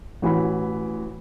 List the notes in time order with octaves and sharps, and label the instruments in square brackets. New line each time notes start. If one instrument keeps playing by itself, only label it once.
[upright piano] A1 E3 F#4 B5